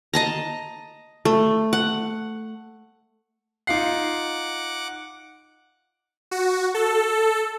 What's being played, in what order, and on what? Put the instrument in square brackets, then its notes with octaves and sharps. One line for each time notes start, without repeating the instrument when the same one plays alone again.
[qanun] D#5 A5 A#5
A3
F#5
[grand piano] D#4 F4 C7 [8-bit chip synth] F#5 D6
[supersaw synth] F#4
A4